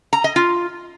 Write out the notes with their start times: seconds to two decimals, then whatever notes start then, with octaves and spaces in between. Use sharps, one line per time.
0.13 A#5
0.24 D#5
0.36 F4